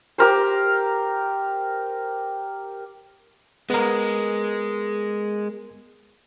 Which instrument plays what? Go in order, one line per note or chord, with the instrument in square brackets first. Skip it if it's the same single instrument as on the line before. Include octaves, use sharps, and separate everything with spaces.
[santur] G4 A#4 C5
[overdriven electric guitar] G#3 [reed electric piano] B3 A#4